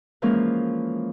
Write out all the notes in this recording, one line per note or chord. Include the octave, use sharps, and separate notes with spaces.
E3 F3 G#3 A#3 C#4 A#4